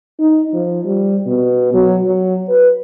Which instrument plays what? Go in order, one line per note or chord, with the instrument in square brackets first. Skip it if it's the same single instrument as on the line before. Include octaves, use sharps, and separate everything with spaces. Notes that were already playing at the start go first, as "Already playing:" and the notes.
[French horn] D#4
F3
G3
B2
F#3
F#3
B4